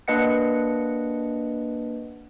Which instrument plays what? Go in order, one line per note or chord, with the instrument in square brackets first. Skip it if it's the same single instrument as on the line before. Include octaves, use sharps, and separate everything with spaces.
[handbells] A#3 D4 B4 D#5 F#5 C#7